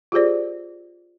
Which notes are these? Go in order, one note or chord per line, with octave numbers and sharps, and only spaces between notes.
F4 G4 G#4 C5 D5